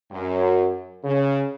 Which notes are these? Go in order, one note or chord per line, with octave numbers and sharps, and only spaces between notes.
F#2
C#3